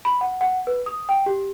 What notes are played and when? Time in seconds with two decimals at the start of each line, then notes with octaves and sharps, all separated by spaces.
0.05 B5
0.21 F#5
0.41 F#5
0.67 B4
0.86 D#6
1.09 G5
1.26 G4